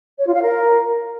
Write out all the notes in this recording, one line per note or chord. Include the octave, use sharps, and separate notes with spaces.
C#5
F4
F5
A#4